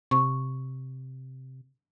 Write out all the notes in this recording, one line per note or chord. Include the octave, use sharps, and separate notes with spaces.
C3 C#6